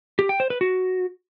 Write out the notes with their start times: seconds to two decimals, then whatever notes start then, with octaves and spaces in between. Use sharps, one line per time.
0.19 G4
0.29 G5
0.40 C5
0.50 B4
0.61 F#4